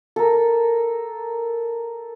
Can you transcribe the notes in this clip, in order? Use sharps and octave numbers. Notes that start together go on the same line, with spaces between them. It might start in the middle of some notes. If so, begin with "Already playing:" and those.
A4 A#4